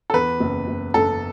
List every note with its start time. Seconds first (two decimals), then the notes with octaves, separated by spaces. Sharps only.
0.10 A4
0.13 E2 B4
0.40 F#1
0.67 F#1
0.94 F#1 A4